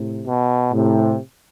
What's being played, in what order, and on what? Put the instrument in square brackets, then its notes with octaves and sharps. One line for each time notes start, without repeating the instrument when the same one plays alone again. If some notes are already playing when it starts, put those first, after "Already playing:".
Already playing: [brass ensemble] A2 C3
B2
A2 C3